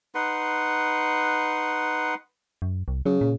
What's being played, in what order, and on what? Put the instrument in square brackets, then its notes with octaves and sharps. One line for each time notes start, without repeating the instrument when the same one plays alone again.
[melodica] D#4 B4 F#5 C6
[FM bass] F#2
C2
[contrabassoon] C#3 [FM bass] F#3
[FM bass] A#2